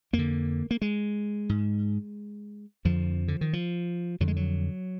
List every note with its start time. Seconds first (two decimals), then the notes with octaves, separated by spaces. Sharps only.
0.13 F2 A#3
0.19 D3
0.71 A#3
0.82 G#3
1.49 G#2
2.85 F2 D3 F3
3.28 D3
3.41 D#3
3.53 F3
4.20 F2 D3 F#3
4.28 G#3
4.36 F#3